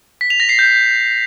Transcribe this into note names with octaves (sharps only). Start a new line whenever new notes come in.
B6
F7
A#6
C7
G6